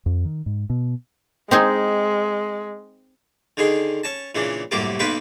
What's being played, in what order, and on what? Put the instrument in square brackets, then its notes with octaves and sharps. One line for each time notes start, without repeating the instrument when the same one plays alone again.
[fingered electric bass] F2
D#3
G#2
B2
[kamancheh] G#3 [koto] C4 D#4 G#4
[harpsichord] D3 D#3 G#4 C6
C#4 A5
A#2 C#3 E3 D4
C2 F#2 A2 A#3 G4 D6
B1 A#3 B3 B4 G5 C6